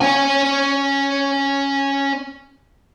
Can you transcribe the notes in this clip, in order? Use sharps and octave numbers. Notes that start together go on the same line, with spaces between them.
C#4 G#5